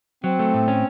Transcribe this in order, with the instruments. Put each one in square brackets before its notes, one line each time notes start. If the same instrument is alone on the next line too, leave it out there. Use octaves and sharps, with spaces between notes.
[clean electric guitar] F#3 [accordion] C4
[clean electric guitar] A3
A2
C#4